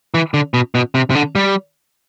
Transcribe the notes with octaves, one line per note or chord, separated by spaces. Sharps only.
E3
D3
B2
B2
C3
C3
D3
G3